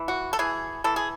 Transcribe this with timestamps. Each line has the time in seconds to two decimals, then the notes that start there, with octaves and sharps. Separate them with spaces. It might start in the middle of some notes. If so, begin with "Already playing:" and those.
Already playing: E3
0.08 F#4
0.33 A4
0.39 E3 G#4
0.84 E3 A4
0.96 G#4